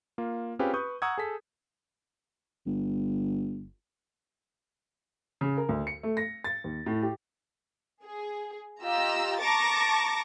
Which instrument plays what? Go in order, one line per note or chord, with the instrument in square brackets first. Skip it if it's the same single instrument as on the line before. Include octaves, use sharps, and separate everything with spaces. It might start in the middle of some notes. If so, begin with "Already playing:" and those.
[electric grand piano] A#3 F4
C4 C#4 F4 G4 G#4 B4
B4 C#6 D#6 G6
F#5 A#5 C#6 D#6 E6 G#6
G#4 A4 B6
[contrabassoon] G1
[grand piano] C#3
A#4
D2
C#7
A3
A#6
A6
D#2
A2
G4
[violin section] G#4
F4 G4 D#5 A#5 E6
A5 A#5 C#6 D6 A6 A#6